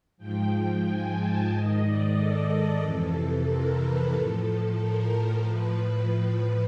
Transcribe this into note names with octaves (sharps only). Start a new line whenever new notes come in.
G#2 F3 G5
G#5
A5
G#2 D#3 D#5
D5
A4
F2 C3 E3
A#4
B4
A2 F3 A4
A#4
A2 F3 B4
B4